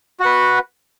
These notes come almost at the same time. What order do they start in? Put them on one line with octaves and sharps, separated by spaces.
F#4 F#5 B4